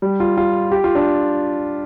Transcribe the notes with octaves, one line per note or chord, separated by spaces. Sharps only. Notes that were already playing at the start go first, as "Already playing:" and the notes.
G3
F4
F4
G4
F4
D4